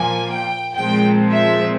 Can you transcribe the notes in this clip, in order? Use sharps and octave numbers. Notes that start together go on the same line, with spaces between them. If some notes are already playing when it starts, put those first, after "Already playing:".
Already playing: A#2 F3 A#3 G#5
G5
A#2 F3 G#3 C4 G5
E5